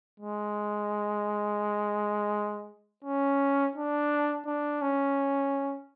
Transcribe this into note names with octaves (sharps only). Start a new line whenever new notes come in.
G#3
C#4
D4
D4
C#4